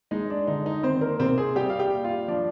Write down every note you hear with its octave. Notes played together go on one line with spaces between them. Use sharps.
G#3 D#4
D4
D3 D#4
D#4
D#3 C4 C5
A#3 A#4
C3 C4 C5
G#4 G#5
G3 G4 G5
F5
G4 G5
A#2
F4 F5
F3 D4 D5